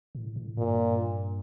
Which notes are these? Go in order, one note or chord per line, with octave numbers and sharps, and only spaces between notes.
A2
A2
G2 A#2